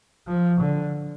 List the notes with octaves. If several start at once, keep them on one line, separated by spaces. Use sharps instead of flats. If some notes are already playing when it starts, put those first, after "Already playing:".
F3
D3